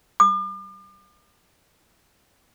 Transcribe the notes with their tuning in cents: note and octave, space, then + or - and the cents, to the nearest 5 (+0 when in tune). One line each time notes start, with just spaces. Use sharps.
D6 +45